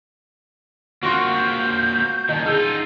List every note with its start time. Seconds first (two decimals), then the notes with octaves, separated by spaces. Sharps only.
1.03 A#3 C4 F4 F#4
1.33 G6
2.29 A#2 D#3 D#5 A5
2.46 D#4 F4 G#4 E6